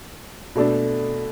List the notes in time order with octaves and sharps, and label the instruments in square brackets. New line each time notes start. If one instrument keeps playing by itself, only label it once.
[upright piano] B2 A3 D4 A4